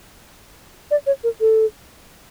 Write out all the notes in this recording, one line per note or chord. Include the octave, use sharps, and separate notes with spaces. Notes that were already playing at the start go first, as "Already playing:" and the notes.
D5
C#5
A#4
A4